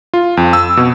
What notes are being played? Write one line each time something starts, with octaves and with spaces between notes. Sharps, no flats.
F4
F2
E6
B2